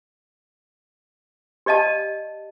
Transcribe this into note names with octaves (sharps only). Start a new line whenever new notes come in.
G4 D5 D#5 F5 A5